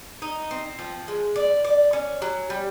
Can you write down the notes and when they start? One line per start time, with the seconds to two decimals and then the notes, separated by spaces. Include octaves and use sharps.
0.22 D#4
0.51 C4
0.79 F3
1.08 G#3
1.36 D5
1.64 D5
1.93 C#4
2.22 F#3
2.50 G3